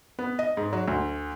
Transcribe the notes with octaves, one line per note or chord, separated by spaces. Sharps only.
B3
D#5
G#2
F#3
D2